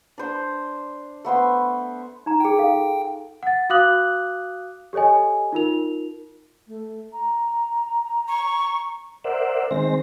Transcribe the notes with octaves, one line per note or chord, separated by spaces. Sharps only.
D4 C5
A3 B3 C5 C6
D#4 A#5
F4 G#4 G5
A4 F5
F#5 A6
F#4 F5 D6 D#6 F#6 F#7
G4 A4 C#5 D#5 G#5
D#4 F4 A#4 F7
A3
A#5
C#6
A#4 C5 D5 E5 F#5
D#3 G#3 C4 C5 A#6